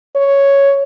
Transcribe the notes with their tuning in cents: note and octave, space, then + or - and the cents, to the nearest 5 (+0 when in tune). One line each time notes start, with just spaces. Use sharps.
C#5 +0